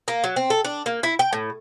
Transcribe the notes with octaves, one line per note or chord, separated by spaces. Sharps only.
A#3
F#3
C4
A4
D4
A#3
E4
G5
A2